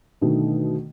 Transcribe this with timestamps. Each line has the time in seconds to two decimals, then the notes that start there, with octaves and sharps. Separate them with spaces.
0.21 B2 D3 D#3 A3